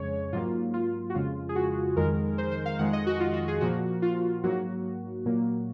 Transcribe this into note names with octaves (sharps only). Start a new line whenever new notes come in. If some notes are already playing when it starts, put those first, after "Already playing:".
Already playing: F2 C#3 G#3 C#5
G#2 F#3 A#3 F4
F4
F#4
F2 C#3 G#3 F4
G#4
F#4
F2 D#3 G#3 A#4
C5
C5
F5
F2 D#3 G#3 F#5
D#5
F#4
F4
F#4
G#4
A#2 F3 A#3 F#4
F4
G#2 F#3 A#3 F#4
A#2 F#3 A#3